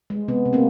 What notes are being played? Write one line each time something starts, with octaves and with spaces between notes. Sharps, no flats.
G#3
C3 B3
C3
A#3 C4